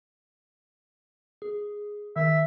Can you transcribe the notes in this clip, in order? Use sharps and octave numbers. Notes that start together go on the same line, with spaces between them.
G#4
D#3 E5